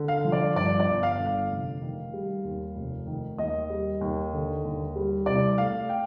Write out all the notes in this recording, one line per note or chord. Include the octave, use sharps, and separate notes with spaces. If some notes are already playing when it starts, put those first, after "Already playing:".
Already playing: D3
F5
F3
D5
G2 D5
D5
G1
F5
D3
F5
F1
D#3
G3
D#2
F1
D#3
D#2 D#5
G3
D#2
D3
D#2
G3
C2 D5
A3 F5
G5